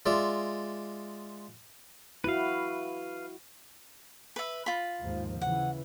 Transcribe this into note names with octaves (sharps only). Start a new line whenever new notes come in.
G#3 F4 D5 E5
E4 F#4 B4 F5
B4 E5
F4 B5
D#2 G#2 F3
C#3 E3 F#5